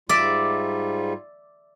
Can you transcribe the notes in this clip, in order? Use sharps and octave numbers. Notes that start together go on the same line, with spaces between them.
G#2 G3 F4 D5 E5